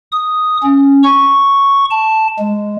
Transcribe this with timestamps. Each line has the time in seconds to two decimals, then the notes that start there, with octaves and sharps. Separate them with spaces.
0.12 D#6
0.63 C#4
1.03 C#6
1.90 A5
2.39 G#3